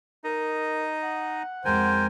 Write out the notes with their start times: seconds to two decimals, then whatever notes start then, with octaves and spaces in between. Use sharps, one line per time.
0.24 D#4 A#4 D#5
1.02 F#5
1.65 F2 G#3 A#4 C5 G5 G#5